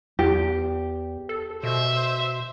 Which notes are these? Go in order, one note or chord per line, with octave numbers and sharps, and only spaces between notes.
E2 G4
A4
B2 C5 E5